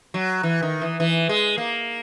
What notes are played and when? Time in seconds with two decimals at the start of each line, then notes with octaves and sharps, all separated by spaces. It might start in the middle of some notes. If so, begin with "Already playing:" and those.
0.14 F#3
0.43 E3
0.63 D#3
0.82 E3
1.00 E3
1.29 G#3
1.58 A#3